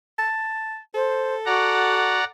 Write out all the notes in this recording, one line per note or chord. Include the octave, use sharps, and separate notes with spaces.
A5
A4 C5
F#4 D5 F#5 A#5